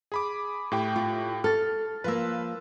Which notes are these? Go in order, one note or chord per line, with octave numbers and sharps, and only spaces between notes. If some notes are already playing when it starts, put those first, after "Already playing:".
G#4 B5 D6
A2 G4 G5
F4
A4 F6 A6
F3 A#3 B4 F5 E6